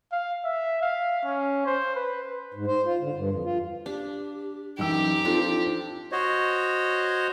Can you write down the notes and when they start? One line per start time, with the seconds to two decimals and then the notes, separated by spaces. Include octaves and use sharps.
0.12 F5
0.45 E5
0.82 F5
1.25 C#4
1.66 C5
1.96 B4
2.54 G#2
2.67 C5
2.85 F4
3.00 D3
3.15 G2
3.31 F2
3.44 F4
3.86 D4 G4
4.78 A1 F#2 D#4 G4 E6
5.25 F3 C4 D4 F4 A4
6.12 F#4 C5 C#5 D#5